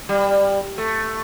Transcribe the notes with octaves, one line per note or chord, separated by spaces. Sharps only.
G3
A3